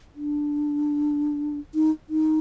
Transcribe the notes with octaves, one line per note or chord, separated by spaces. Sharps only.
D4
D#4
D#4